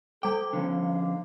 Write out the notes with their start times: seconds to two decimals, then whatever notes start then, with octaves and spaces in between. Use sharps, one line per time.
0.23 G3 A4 G5 D6
0.53 D3 F3 C#4 F5
0.86 F5